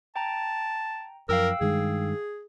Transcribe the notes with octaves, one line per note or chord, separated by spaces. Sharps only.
G5 A5 A#5
F#2 F3 A#4 F5 G5 E6
G2 D#3 G#3 G#4